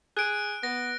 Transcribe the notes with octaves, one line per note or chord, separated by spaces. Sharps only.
G#4 F#6 D7
B3 A#6